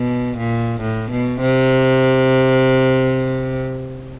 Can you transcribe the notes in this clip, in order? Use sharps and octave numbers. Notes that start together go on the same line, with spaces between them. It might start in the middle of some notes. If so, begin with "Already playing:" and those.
Already playing: B2
A#2
A2
B2
C3